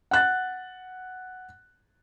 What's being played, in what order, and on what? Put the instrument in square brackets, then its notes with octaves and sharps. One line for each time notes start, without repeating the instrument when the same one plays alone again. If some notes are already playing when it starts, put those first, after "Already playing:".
[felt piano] F#5 F#6 A6